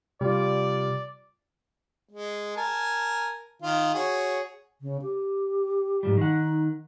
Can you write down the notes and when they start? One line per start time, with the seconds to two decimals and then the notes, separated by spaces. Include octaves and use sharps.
0.21 C3 G3 F4 D5
2.10 G#3
2.57 A#4 G#5 A5
3.62 D#3 F4
3.94 F#4 G#4 C#5
4.81 C#3
5.02 G4
6.03 G#2 F3 G3
6.17 D#3 D#4 F#5